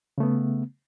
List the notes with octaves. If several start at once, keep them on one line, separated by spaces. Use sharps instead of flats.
C#3 A3 B3